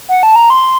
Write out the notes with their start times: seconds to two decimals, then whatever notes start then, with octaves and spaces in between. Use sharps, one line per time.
0.09 F#5
0.23 A5
0.36 A#5
0.50 C6